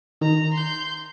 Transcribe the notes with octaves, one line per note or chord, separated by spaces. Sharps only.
D#3 A#5
C6 G6